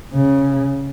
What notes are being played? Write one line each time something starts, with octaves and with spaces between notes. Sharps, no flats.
C#3